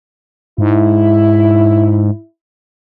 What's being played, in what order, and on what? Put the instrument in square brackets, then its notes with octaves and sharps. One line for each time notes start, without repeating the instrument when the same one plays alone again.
[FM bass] G#2 [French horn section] E4